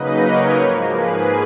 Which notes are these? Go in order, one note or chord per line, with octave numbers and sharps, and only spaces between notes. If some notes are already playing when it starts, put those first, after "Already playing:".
Already playing: C#3 F#3 A#3 D#4 B4 D#5
A#4 C#5
G#2 F3 A#3
G#4 B4